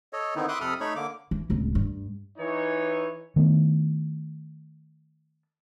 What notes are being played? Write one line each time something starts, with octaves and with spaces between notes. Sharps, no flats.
A4 C#5 D#5
D3 D#3 B3 C4 D#4 E4
E5 B5 C6 D6 D#6 F#6
F2 C3 A4 B5 D#6 F6
A3 D#4 C#5 B5 C#6
D3 A#3 D6
E3
D1 C#2
G2
E3 D#4 C#5
D#3 A3 B3 D4